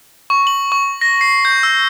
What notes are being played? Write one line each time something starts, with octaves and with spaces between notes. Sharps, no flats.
C#6
F#7
C#6
A#6
C7
G6
E6